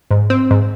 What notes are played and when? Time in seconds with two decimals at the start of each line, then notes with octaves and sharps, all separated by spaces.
0.11 G#2
0.30 C4
0.51 G#2